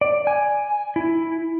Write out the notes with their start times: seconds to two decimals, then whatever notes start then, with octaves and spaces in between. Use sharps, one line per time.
0.01 D5
0.27 G#5
0.96 E4